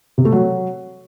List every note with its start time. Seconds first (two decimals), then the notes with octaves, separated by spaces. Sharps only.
0.18 C3
0.25 A3
0.32 F#3